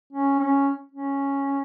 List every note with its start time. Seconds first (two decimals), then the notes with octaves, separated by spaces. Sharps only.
0.13 C#4
0.39 C#4
0.92 C#4